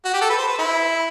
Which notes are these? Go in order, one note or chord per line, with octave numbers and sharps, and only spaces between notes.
F#4
G4
A4
B4
C5
B4
E4